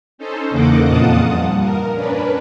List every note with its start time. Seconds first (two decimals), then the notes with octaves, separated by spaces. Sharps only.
0.18 C#4 D#4 A4 C5
0.50 E2 C#3 A#3 D#5 F#5 D6
0.85 F2 A#2 F4 F#5 A5 D#6
1.25 G2
1.60 A#4
1.93 C#4 D4 B4